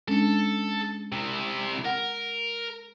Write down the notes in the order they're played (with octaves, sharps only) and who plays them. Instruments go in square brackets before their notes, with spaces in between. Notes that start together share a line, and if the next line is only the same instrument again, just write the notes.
[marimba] G#3 C#4 D4 [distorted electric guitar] A4
[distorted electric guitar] C3 E4
[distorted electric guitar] A#4 [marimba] F#5